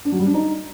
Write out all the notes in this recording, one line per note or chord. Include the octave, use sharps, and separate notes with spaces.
D4
F#3
G3
D4
D#4